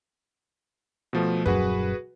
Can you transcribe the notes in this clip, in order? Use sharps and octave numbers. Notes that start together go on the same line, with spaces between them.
B2 F3 A3
D#1 F#2 F#4 G#4 B4